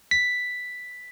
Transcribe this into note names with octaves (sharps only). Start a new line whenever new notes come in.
B6